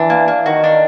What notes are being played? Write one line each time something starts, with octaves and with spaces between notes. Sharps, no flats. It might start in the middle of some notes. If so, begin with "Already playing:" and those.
Already playing: E3 D4
A#3
A#3
D#3 F#4
D4